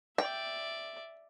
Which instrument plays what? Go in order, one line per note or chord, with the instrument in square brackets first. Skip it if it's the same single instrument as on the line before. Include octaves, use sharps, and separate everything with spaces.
[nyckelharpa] D5 E5 [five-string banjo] G5